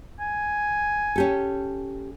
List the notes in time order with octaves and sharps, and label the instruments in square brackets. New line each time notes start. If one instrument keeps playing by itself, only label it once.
[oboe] G#5
[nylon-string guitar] C#4 G4 A4